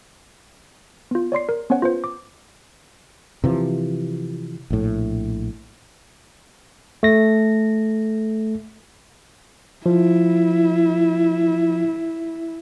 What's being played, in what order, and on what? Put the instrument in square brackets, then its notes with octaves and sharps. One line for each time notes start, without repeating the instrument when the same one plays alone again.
[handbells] B3 F4
C#5 D5 C6 C7
A#4
B3 C#4 C5 C#5 F#5
F4 B4 C5
D6
[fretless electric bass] C3 E3 F3
A#1 A2
[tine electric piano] A3 A#6
[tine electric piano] F3 [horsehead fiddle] E4